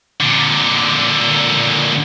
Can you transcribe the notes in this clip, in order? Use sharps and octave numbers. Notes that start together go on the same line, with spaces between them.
A#2 D3